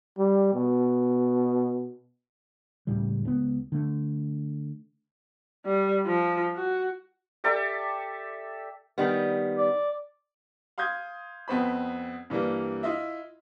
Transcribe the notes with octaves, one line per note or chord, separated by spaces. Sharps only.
G3
B2
C#2 A2 C#3 G3
C#2 B3
D3 A3
G3
F3
F#4
G4 A4 D5 E5
D#3 G3 B3
D5
F5 C6 D#6 G6 G#6
F2 B3 C4 B5
G2 E3 G3 A#3
E4 F4 D#5 E5